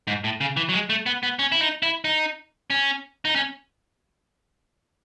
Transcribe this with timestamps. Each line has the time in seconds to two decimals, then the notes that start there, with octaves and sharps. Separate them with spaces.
0.07 G#2
0.24 A2
0.41 C#3
0.57 E3
0.69 F#3
0.73 G#3
0.90 A3
1.06 B3
1.23 B3
1.39 C#4
1.52 E4
1.61 D#4
1.83 E4
2.05 D#4
2.70 C#4
3.25 D#4
3.36 C#4